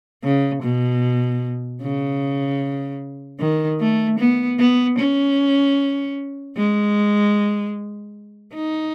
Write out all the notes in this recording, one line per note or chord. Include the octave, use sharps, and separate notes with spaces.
C#3
B2
C#3
D#3
A3
B3
B3
C#4
G#3
D#4